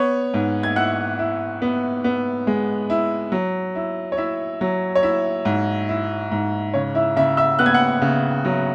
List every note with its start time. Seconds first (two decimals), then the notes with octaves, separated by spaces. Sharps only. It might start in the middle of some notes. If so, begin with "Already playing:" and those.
Already playing: B3 C#5 C#6
0.34 G#2
0.63 G#6
0.76 E4 F#5 F#6
1.19 E4
1.62 B3
2.04 B3
2.47 G#3
2.90 E4
3.32 F#3
3.75 E4
4.12 C#5
4.17 E4 E5
4.61 F#3
4.95 C#5
5.03 E4 E5
5.45 G#2
5.89 E4
6.31 G#2
6.74 C#3 C#5
6.95 E4 E5
7.16 C#3 E4 E5
7.37 E5 E6
7.59 B3 F#6
7.66 G#6
7.74 F#5 F#6
8.02 C#3
8.45 F#3